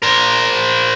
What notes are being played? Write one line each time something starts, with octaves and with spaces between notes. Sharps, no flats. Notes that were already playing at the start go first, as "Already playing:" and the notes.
A#4 C5